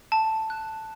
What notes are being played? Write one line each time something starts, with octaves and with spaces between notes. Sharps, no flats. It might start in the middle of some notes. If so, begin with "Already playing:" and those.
A5
F#6